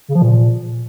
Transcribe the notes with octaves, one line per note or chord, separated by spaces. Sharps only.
C#3
F3
A#2